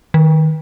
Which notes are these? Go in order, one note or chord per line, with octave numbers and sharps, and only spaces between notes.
D#3